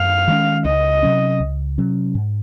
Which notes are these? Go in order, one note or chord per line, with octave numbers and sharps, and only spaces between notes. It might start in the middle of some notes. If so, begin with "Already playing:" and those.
Already playing: F#2 F5
D#3 G#3 C#4
C#2 D#5
C3 F#3 C#4
C#2
C3 F#3 C#4
G#2